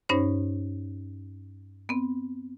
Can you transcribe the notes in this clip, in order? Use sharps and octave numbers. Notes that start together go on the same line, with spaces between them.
G2 C#4 D#4 C5 C#5
B3 C4